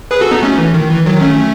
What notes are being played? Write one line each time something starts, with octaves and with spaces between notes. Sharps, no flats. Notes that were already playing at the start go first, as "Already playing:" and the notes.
G#4 B4
F#4 A4
B3 D#4
A3 C#4
E3
D#3
E3
D#3 F#3
A3 C#4